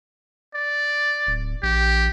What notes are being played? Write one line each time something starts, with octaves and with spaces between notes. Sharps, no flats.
D5
D1
A#1 G4